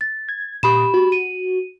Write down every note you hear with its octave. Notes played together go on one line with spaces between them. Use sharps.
A6
G#6
A#2 G4 B5 D#6 E7
F#4
D#7